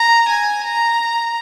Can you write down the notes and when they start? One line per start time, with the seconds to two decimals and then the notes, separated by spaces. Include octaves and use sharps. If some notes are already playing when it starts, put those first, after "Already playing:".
Already playing: A#5
0.28 G#5
0.64 A#5